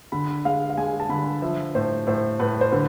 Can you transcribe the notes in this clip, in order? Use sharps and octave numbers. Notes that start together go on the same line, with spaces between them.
D3 B5
G#3 F5
F5
G#3 G#5
A5
D3 B5
F3 E5
A2 C5
A2 C5
A2 B4
C5
D3 B4